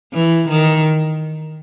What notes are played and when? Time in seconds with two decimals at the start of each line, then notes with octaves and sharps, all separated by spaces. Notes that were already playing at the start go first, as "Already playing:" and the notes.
0.13 E3
0.49 D#3